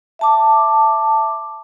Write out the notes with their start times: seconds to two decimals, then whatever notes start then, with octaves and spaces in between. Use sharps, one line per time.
0.19 E5 A5 D6